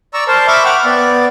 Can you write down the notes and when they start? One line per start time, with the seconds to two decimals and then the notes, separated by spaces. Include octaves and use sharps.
0.14 D5 A#5 C#6 E6
0.28 A#4 C5 A5
0.47 E5 B5 C#6 D6
0.65 F#5 G5 D6 F6
0.85 B3 D5